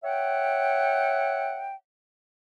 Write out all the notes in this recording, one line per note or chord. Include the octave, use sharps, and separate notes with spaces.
C#5 E5 F#5 G5